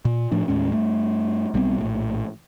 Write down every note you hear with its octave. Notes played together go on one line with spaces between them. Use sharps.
A#2
A2 F3 D4
D#2 A2 G#3 C#4
G2 A3
B1 G3 B3 C4
A#1 A2